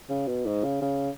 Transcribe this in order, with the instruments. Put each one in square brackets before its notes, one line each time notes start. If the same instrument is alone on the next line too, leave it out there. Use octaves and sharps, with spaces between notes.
[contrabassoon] C#3
B2
G#2
C#3
C#3